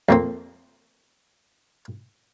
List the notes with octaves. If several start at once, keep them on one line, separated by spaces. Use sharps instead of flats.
F2 A#3 C4